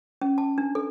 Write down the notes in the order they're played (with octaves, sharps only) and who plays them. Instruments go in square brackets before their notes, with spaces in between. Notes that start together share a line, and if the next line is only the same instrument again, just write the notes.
[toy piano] C#4
A5
D4
A4